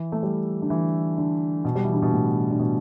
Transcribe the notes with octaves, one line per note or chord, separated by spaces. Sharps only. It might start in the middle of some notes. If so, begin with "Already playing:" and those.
Already playing: E3
A3
G3
D3
E3
D3
B2
G3
E3
D3
B2
A2
D3
B2